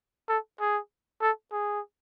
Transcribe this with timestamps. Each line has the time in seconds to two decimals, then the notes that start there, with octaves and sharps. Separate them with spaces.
0.29 A4
0.60 G#4
1.22 A4
1.52 G#4